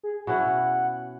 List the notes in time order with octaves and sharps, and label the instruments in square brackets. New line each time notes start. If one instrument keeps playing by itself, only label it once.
[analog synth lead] G#4
[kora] B2 C#4 E4 [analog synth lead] F#5